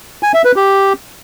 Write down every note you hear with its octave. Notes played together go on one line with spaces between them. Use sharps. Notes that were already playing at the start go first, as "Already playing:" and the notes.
G#5
E5
B4
G4